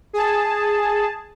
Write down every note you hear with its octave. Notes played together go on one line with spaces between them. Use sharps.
G#4 A5